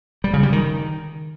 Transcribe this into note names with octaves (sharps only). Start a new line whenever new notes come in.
G3
C#3
G3
D#3